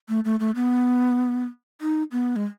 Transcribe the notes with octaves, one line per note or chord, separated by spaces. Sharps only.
A3
A3
A3
B3
D#4
B3
G#3